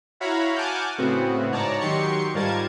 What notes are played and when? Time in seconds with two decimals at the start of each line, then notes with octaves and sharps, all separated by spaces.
0.20 E4 F#4 C#5 F5 A#5 B5
0.56 F#5 G#5 A5 D6 F6 G6
0.98 A2 C#3 B3 C4 F#4
1.52 G#2 C#5 D5 A5 A#5
1.80 D#3 F#3 G4 C6 C#6 C#7
2.34 G#2 G3 F4 A#4 A5 G#6